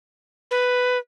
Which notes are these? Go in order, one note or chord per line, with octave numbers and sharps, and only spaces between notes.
B4